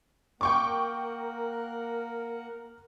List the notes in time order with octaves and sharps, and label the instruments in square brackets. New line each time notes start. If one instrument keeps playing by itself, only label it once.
[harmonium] A#3 F#5 [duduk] A#4 [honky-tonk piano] G5 C#6 D6